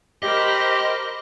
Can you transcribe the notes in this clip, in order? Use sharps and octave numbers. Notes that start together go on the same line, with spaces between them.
G4 A#4 C5 D#5 B5